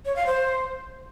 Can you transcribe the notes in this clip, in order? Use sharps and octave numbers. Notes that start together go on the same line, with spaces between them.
C#5
F5
C5